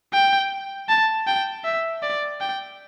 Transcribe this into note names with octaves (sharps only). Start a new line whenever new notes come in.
G5
A5
G5
E5
D5
G5